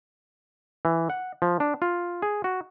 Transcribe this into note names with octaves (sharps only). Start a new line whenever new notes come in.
E3
F#5
F3
D4
F4
G#4
F#4